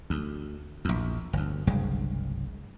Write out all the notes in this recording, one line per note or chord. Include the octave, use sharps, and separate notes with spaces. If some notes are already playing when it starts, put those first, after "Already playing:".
D2
A#1 E2
G1 D2
F#1 C2 G2 G#3